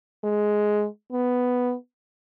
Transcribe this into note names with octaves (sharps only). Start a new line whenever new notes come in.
G#3
B3